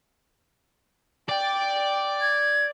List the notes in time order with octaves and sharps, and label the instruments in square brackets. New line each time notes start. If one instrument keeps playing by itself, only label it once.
[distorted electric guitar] D5 [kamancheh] G5
[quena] G#6